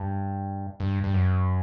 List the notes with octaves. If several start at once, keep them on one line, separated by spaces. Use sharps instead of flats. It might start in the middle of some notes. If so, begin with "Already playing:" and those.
Already playing: G2
G2
G2
F#2